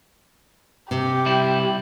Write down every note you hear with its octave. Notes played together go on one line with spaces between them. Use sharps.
C3 G4
G3 E4